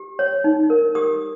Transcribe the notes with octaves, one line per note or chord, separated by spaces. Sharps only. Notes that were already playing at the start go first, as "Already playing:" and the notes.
Already playing: G4
C#5
D#4
A#4
G4 D#6